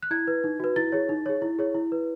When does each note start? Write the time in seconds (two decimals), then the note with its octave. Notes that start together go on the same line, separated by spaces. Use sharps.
0.02 F#6
0.11 E4 G#6
0.27 B4
0.44 D#4
0.60 F#4 B4
0.76 E4 A6
0.92 G#4 C#5
1.09 D#4
1.26 G#4 C#5
1.42 E4
1.59 G#4 C#5
1.75 E4
1.92 B4